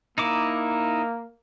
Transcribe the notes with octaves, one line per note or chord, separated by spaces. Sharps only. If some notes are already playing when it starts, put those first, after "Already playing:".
A#3 D#4 E4 D6